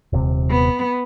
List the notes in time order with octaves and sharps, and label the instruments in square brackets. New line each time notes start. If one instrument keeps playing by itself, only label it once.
[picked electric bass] D#1 C3
[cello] B3